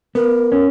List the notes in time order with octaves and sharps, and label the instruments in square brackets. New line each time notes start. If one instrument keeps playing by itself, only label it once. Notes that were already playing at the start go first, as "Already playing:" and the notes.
[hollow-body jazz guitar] B3 [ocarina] A#4
[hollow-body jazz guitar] C#4